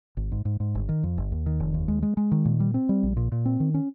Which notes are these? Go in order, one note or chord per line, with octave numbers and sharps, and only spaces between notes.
G#1
G#2
G#2
G#2
G1
D#3
F2
G1
D#2
D#3
F1
D#2
G#3
G#3
G#3
D#3
A#2
G3
C4
G3
A#1
A#2
A#2
C4
D#3
C#4